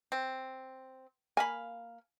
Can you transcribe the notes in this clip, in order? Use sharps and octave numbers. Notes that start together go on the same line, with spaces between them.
C4
A#3 F5 G#5 B5